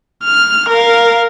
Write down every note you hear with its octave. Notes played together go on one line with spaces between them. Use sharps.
F6
A#4 F5